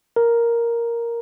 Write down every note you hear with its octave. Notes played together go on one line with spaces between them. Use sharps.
A#4